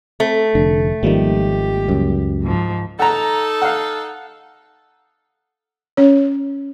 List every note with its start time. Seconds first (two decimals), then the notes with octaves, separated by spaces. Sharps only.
0.20 A3 C4
0.55 F1 D3
1.03 G#1 D#3 F3 G3 A#3 G4
1.88 C#2 F#2
2.42 G#2 F3
2.99 D#4 A4 F#5 A#5
3.62 F5 F#5
5.97 C#4 C#5